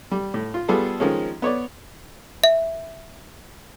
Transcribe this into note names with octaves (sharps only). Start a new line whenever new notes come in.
G3
A2
F4
G3 B3 F4 G#4 A4
D#3 F3 G#3 C#4
B3 C#5 D5
E5